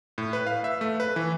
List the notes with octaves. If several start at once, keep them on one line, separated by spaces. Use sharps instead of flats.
A2
B4
F5
E5
A3
B4
E3